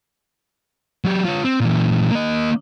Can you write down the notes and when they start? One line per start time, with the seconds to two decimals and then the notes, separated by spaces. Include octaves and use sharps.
1.04 F#3 G4
1.25 F4 C#5
1.45 C4
1.60 A#2 E3
2.11 A#3 D#5